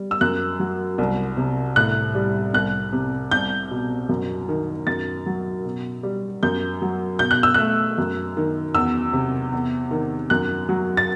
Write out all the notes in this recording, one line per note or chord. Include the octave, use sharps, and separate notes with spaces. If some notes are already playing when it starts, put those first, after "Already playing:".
Already playing: G3
E6
F#2 F#6
F#3
C2
C3
A2 F#6
G3
C2 F#6
C3
C2 G6
B2
F#2
D#3
F#2 A6
F#3
B2
G3
F#2 G6
F#3
B2 G6
F#6
E6
A3 F#6
F#2
D#3
E2 E6
C3
E2
D#3
F#2 F#6
F#3
A6